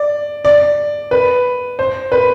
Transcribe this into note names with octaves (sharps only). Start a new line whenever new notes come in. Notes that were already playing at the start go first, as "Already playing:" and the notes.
Already playing: D5
D5
B4
C5
B4